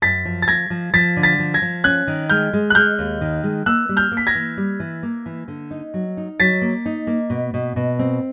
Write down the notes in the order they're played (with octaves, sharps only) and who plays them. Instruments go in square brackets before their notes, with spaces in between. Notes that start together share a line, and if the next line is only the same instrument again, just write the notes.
[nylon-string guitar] F#2 [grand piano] A6 B6
[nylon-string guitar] F3
[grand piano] A6
[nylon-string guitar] A3 [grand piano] G#6 A#6
[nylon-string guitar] F3
[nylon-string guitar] F3 [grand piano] A6 B6
[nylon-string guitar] D3
[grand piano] A6 B6
[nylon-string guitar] F3
[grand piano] G#6 A#6
[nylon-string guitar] F3
[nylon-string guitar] C#4 [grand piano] F#6 G#6
[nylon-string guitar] D#3
[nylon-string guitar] G#3 [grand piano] F6 G6
[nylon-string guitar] G#3
[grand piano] F#6
[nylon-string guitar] G#3 [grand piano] F6 G6
[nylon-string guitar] D#2
D#3
G#3
[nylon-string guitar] A#3 [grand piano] E6 F#6
[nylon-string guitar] G3
[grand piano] F6 G6
[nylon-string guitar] A#3
[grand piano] B6
G#6 A#6
[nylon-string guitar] E3
G3
E3
A#3
E3
D3
D#4
F#3
D#4
[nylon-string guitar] F#3 [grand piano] A6 B6
[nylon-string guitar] A#3
D#4
A#3
B2
B2
B2
C4